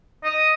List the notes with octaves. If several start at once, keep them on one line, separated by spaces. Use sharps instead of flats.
D#5